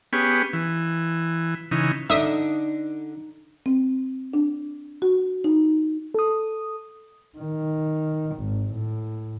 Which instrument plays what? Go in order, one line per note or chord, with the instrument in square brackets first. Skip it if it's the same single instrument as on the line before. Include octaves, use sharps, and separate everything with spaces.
[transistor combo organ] B3 C#4 G4 G#4
E3
C#3 E3 D#4
[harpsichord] D3 D4 [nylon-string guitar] D#4 [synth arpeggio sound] E5 D#6
[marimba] C4
D4
F#4
D#4
[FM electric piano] A4 D#6
[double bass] D#3
G#1
A2